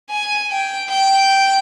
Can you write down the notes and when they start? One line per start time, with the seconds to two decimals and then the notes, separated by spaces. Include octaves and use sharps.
0.10 G#5
0.50 G5
0.89 G5